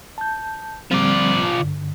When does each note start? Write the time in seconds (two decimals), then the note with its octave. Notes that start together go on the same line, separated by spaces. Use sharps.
0.18 A5 G6
0.91 D3 F3 G3 C4 D5
1.60 G2 D3